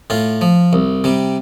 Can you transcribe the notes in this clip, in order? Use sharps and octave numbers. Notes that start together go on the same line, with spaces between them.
A2 F4
F3
C2
C3 G3